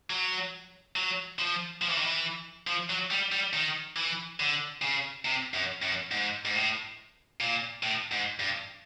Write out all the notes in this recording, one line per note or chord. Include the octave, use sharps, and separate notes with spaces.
F#3
F#3
F3
F3
E3
D#3
E3
F3
F#3
G3
G3
D#3
E3
D3
C#3
C3
F#2
F#2
G#2
G#2
A2
A#2
A2
G#2
G2